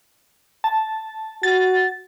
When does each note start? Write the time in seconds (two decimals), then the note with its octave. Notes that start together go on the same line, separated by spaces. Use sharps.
0.64 A5
1.43 F#4 A6